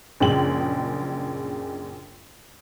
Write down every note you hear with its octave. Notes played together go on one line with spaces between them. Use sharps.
A#1 F#2 C#3 G#3 G5 F#7